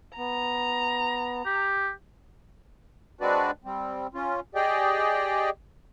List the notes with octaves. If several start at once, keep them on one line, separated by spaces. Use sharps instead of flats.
B3 A#5
G4
G#3 C4 D4 F#4 B4 D5
G3 C4
C#4 F4
G4 G#4 D5 D#5 G5